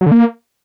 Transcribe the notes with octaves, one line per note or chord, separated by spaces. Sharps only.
F#3
D3
A#3